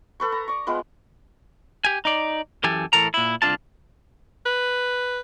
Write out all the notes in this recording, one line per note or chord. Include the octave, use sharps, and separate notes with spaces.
A4 B4 C#6
A#5
D5 C#6
G#3 B3 F4 B4
G4 G#5
D#4 D5
F#2 E3 G4 A4 G#5
A2 E3 A4 A#4 A#5
A#2 E4
C2 D3 D4 D#4 F4 A5
B4